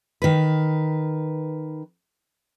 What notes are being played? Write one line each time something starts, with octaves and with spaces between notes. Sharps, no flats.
D#3 B4